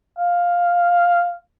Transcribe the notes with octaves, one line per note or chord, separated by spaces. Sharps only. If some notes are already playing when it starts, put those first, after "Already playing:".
F5